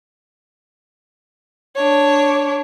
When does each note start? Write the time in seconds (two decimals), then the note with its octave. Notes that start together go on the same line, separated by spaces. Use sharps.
1.76 D4 C#5